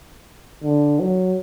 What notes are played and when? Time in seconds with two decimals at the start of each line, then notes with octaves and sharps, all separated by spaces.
0.64 D3
1.00 F#3